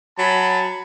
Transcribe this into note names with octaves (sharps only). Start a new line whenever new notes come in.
F#3 G#5 A5 B5